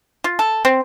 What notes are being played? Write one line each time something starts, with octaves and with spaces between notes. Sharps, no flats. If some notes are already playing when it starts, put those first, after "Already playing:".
F4
A4
C4